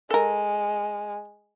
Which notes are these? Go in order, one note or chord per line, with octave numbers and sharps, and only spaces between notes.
G#3 A4 A#4